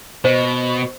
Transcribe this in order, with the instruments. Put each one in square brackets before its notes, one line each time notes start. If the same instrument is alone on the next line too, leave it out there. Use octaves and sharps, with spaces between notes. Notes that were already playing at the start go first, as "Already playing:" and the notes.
[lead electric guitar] B2 [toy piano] C5